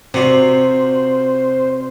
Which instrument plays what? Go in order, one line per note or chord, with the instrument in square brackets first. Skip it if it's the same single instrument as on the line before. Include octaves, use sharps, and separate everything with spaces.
[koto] C3 [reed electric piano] C4 D5 [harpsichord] F4 F#4 F#5 [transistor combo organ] C5